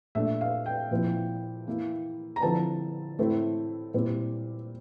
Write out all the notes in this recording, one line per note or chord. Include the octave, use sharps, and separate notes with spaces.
A#2 A3 D4 E5
F5
G5
A#2 F3 C4 E4
E3 A#3 E4
A#5
D3 F3 C4 E4 A5
A2 E3 A3 C4 E4
A#2 G3 C4 E4